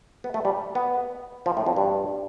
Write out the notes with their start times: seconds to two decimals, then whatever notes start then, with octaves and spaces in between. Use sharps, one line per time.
0.24 B3
0.34 A3
0.45 G3
0.75 B3
1.46 F3
1.57 A2
1.66 F2
1.76 G2